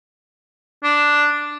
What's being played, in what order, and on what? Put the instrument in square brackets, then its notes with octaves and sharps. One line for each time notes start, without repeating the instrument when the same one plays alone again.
[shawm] D4